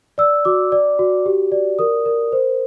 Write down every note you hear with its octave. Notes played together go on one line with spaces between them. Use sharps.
D5 E6
F#4 D6
D5
F#4
G4
D5
A#4 D#6
A#4
C5